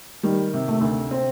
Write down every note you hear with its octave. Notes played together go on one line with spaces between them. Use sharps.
D#3 G3
C3
A3
D2
C4